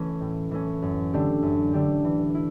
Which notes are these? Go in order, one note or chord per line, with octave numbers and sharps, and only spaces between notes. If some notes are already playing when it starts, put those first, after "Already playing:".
Already playing: E3 A3 C#4
A2
E3 A3 C#4
F#2
D3 A3 D4 G4
F#2
D3 A3 D4 G4
E3
E4